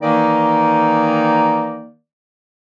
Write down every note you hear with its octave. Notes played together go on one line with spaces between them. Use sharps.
D#3 E3 A#3 D#4 D5